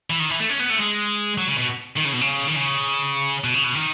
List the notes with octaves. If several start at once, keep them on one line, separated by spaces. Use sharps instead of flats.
E3
D#3
E3
A3
C#4
B3
A3
G#3
F#3
C#3
B2
D#3
C#3
B2
C#3
D#3
C#3
B2
C#3
B2
D#3